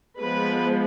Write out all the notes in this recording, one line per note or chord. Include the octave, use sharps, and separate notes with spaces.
F3 G#3 B3 B4